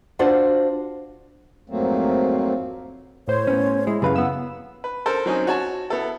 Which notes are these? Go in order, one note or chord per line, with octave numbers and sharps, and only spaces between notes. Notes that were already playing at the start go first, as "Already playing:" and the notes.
D4 F4 F#4 C5 D5 F#5
F2 G#2 F#3 A3 A#3 C4
A2 C5 C#5
B3 C#4
G#3 E4
F#2 C#3 B4 F5
B3 E6
B4
A4 A#4 C5
F#3 C4 C#4 D#4
F#4 C#5 A5
B3 E4 A4